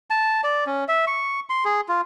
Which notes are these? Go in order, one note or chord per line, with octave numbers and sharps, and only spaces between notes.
A5
D5
C#4
E5
C#6
C6
G#4
F4